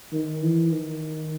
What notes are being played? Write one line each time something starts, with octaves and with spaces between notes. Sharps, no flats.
D#3
E3
D#3